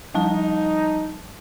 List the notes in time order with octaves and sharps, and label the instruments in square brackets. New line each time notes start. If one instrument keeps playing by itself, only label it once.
[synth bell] F3 G3 A5 [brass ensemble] D#4